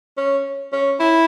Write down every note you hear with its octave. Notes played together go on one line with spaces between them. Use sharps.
C#4
C#4
E4